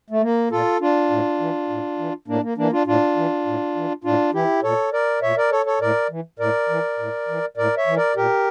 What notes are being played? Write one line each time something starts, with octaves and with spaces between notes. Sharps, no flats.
A3
A#3
A#2 F4 A4
D4 F4
A2
E3
A2
E3
A2 A#3 D4
A#3
E3 A#3 D4
D4 F4
A2 D4 F4
E3
A2
E3
A2 D4 F4
E3 E4 G4
A#2 A4 C#5
A#4 D5
A#2 C#5 E5
A#4 D5
A4 C#5
A4 C#5
A2 A#4 D5
E3
A2 A#4 D5
E3
A2
E3
A2 A#4 D5
C#5 E5
E3
A#4 D5
A#2 G4 A#4